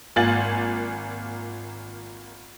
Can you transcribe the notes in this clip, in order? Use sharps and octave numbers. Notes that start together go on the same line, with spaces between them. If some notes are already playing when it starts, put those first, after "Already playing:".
G#1 A#3 F4 G#5 A6 F#7